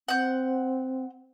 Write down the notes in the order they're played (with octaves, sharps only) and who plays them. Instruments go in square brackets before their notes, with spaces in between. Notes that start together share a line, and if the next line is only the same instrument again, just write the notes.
[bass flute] C4 [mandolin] F#5 G6